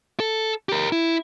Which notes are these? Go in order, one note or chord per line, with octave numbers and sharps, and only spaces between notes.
A4
G4 A#4
E4